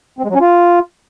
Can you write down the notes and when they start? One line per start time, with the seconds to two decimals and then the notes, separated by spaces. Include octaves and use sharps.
0.19 C4
0.24 G#3
0.30 F#3
0.35 C#4
0.41 F4